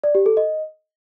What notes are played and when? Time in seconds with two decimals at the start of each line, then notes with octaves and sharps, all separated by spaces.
0.04 D5
0.15 G4
0.26 A4
0.37 D#5